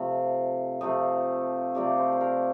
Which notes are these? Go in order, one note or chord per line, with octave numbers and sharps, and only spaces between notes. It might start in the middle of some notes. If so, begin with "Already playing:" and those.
Already playing: C3 F3 A3
C3 F3 A3 D#5
C3 F3 A3 D5
C5
C5
A#4